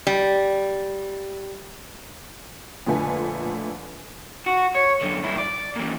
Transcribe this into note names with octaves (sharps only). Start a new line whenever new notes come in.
G3
F2 A#2 D3 A3 B4 G#5
F#4
C#5
F#2 D3
G2 E4
D5
A#2 E3